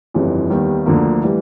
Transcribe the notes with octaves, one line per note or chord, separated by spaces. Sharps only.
G1 F2 C#3 E3 G3
D#2 D#3 G3 B3
D2 D3 F3 A#3
E3 G3